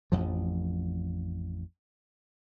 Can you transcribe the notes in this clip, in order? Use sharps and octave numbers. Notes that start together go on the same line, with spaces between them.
A1 F2 F3